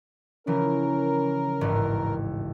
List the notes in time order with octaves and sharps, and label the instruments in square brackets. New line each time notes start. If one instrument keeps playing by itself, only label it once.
[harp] C#3 E3 F3 [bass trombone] C#4 [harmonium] A#4
[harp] E1 A1 G#2